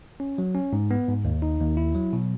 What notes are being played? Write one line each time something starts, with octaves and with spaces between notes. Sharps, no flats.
C#4
F#3
C#4
G#2
B3
G#2
D#2
D#4
D#2
E4
F#3
B2